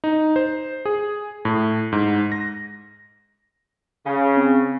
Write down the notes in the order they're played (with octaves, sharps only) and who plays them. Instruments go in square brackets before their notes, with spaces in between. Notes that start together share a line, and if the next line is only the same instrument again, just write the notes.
[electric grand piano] D#4
C5
G#4
A2
G#2
A#6
[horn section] C#3
[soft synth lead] C4